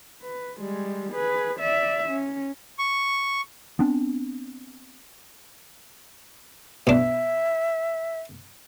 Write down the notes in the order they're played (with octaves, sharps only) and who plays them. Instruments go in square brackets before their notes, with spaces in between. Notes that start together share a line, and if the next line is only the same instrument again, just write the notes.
[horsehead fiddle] B4
G3 G#3
G#4 B4
D5 E5
C#4
[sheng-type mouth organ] C#6
[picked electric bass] B3 C4 D4
[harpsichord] B2 D4 [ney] E5